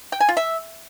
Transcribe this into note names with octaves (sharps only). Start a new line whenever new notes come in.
G5
G#5
F4
E5